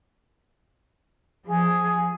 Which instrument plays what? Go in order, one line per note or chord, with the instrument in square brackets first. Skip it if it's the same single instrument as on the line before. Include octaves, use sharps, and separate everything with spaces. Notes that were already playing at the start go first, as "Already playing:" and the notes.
[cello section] F3 [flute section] G#4